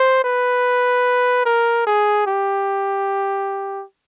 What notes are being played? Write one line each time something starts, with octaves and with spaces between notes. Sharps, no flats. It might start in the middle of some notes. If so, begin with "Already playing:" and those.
Already playing: C5
B4
A#4
G#4
G4